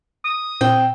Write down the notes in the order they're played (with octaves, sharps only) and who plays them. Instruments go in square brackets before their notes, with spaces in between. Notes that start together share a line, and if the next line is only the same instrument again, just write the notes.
[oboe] D#6
[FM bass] A#2 [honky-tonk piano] C4 [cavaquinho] G5